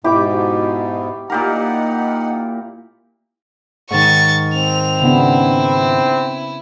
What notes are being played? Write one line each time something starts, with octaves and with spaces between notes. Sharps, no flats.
G#2 B2 E4 G4 D6
A#2 D#4 G4 A#4 F#5
G#2 D#3 C#6 A6
C4 F7
C#3 B3 D4 E4